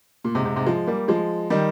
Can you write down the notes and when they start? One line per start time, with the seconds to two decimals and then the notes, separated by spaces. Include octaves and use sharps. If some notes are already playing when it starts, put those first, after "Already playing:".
0.24 A#2
0.35 G#2 C3
0.45 G#2 C3
0.56 G#2 C3
0.66 F3 G#3
0.87 G3 A#3
1.08 F3 G#3
1.50 D#3 G3